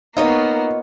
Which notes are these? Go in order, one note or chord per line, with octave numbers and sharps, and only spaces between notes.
A#3 B3 D#4 F4 C#5 D#5